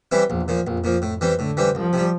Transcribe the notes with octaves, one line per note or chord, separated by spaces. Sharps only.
E3 G3 C4 E4
A#1 E2
A#2 F3
A#1 F2
A#2 F3
A2
E3 G3 C4
A2 D3
E3 G3 C4
C2 F3
C3 G3